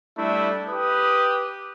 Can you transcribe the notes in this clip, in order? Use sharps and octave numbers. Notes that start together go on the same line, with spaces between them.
G3 A3 D4 E4
G4 B4 D6 D#6